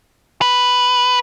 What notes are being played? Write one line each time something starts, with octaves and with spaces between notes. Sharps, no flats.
B4